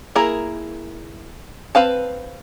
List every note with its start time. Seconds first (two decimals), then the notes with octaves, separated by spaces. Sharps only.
0.15 A#3 E4 G#4 A#4 A#5
1.75 C4 B4 F5 A5